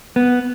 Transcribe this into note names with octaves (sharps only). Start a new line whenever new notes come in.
B3